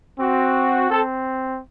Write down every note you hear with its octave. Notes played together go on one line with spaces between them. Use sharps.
C4 F#4
C4 A4